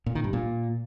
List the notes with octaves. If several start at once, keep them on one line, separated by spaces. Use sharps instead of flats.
A#2
D#3
G2
A#2